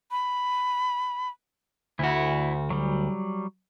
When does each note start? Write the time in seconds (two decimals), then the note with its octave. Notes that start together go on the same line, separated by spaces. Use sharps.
0.11 B5
1.99 D2 E4 F#4
2.70 F#3 G3